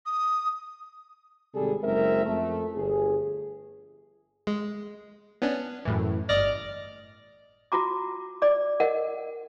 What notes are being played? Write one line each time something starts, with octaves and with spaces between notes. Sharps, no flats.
D#6
G#1 C3 G3 G#4 A4
F#1 G#3 C4 A#4 E5
F2 A3
G1 G#4
G#3
B3 C#4 D4
F#2 A2 E3
G1 D5 D#5 F6 A#6
F4 F#4 A#5 D6
D5 D6
A#4 D#5 F#5